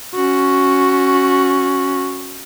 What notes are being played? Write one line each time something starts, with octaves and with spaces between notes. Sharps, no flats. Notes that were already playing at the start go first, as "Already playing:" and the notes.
C#4 F#4